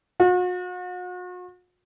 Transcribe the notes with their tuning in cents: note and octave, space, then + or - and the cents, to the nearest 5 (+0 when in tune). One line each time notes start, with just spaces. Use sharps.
F#4 -40